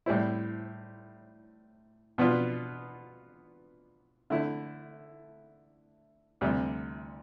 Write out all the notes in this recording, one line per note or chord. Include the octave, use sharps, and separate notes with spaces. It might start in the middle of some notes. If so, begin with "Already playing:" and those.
A2 G3 C4 E4
B2 B3 D4 F4
D3 A3 E4
D2 C3 G3